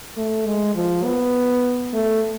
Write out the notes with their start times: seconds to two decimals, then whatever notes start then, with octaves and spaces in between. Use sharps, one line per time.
0.17 A3
0.46 G#3
0.75 F3
1.04 B3
1.93 A3